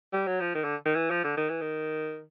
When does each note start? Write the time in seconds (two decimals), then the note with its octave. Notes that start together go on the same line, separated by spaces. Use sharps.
0.13 G3
0.27 F#3
0.41 F3
0.55 D#3
0.64 D3
0.85 D#3
0.95 E3
1.10 F3
1.24 D3
1.37 D#3
1.50 E3
1.61 D#3